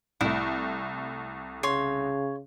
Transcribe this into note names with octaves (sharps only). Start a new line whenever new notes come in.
C2 A3 E4
C#3 C#5 C6